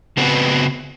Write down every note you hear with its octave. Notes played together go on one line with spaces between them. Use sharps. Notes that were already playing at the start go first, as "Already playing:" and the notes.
C#3 B3 C4 F#4 B4